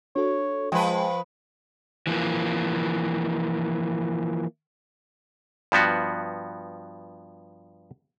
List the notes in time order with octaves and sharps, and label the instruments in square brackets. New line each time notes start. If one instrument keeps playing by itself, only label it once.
[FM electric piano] D4 F#4 A4 [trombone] C#5
[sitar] F3 B4 [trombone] G#3 [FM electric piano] G5 A5 B5
[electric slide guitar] E3 F3 A#3
[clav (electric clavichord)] G2 F3 B3 F#4